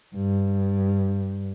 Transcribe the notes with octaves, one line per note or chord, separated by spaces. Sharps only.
G2